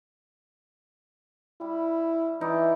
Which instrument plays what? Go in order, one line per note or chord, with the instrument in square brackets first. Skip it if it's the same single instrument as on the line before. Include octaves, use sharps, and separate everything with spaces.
[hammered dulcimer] G3 [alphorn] E4
[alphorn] E3 [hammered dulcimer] D#4 E4 D5